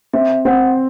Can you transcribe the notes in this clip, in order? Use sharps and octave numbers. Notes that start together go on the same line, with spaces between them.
C4 E5
C4 F#5